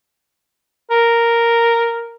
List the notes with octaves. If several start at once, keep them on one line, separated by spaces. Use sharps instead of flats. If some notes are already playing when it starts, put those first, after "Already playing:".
A#4